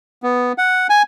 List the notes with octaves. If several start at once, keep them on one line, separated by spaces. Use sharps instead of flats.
B3
F#5
G#5